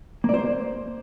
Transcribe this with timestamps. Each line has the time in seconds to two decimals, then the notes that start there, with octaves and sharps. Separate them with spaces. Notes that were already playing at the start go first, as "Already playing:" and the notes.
0.24 A#3
0.29 D5
0.34 C5